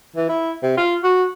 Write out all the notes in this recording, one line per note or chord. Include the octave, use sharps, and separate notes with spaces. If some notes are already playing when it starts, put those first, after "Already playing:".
E3
E4
C3
F4
F#4